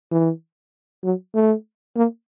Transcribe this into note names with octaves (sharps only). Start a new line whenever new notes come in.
E3
F#3
A3
A#3